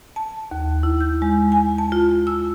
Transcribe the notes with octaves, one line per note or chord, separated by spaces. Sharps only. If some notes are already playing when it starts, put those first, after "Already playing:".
A5
D#2
E4
G6
G#3
G#5
A5
F4
E6